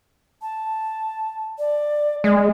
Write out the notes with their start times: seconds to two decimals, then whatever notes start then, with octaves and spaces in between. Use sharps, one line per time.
0.42 A5
1.59 D5
2.24 G#3 D5